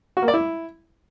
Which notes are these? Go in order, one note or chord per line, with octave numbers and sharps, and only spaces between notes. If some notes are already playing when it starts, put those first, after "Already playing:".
F#4
A#3
D5
E4